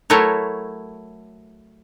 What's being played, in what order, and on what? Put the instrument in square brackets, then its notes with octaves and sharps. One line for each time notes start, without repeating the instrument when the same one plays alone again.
[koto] F#3 A3 E4 A#4 C#5